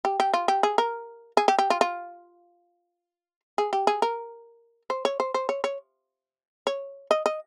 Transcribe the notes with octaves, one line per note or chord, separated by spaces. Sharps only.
G4
G4
F4
G4
G#4
A#4
G#4
G4
G4
F4
F4
G#4
G4
G#4
A#4
C5
C#5
C5
C5
C#5
C#5
C#5
D#5
D#5